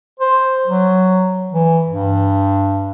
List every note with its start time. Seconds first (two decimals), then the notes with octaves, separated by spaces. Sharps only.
0.20 C5
0.68 F#3
1.53 E3
1.89 G2